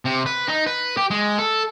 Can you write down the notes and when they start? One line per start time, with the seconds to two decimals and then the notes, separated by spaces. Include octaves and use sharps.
0.05 C3
0.26 B4
0.48 D#4
0.67 B4
0.97 G4
1.11 G#3
1.39 A4